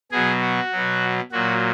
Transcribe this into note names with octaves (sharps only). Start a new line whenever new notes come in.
B2 F#3 G#4
F#4
B2 F#3
A#2 F#3 F#4